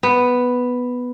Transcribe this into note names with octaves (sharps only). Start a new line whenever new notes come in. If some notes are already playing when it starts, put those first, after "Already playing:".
B3